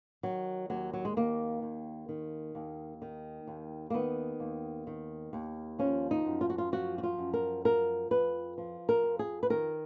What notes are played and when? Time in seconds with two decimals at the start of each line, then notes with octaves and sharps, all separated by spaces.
0.23 D#3 F#3
0.70 D#2 F#3
0.93 F#3
1.05 G#3
1.16 D#3 A#3
1.62 D#2
2.09 D#3
2.55 D#2
3.02 D#3
3.47 D#2
3.90 A#3
3.94 D#3 B3
4.40 D#2
4.87 D#3
5.33 D#2
5.79 F3 C#4
6.11 D#4
6.26 F#2
6.41 F4
6.50 F#4
6.58 F4
6.72 F3 F#4
6.98 F#4
7.03 F4
7.18 F#2
7.34 A#4
7.64 F3 A#4
8.11 F2 B4
8.58 F3
8.89 A#4
9.03 F2
9.19 G#4
9.43 B4
9.50 D#3 A#4